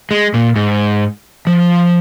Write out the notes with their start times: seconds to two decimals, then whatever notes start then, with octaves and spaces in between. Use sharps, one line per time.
0.11 G#3
0.34 A#2
0.56 G#2
1.47 F3